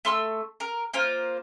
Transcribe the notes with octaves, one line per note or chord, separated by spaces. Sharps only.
A3 C6 E6
A#4
A#3 F4 C5